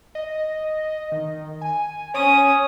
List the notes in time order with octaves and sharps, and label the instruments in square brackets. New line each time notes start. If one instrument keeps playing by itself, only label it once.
[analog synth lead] D#5
D#3
G#5
[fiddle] C#4 D#6 [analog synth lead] C#5